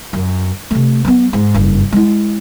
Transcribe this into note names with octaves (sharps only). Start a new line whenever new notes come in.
F#2
C3 A3
F#3 B3
G#2
F#1 G2
G#3 E4